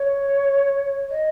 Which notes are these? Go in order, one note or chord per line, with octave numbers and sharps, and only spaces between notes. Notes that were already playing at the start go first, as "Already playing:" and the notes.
Already playing: C#5
D#5